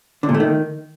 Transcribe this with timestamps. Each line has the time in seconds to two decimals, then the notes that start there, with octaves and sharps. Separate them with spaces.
0.23 D3
0.29 A#2
0.34 A3
0.40 D#3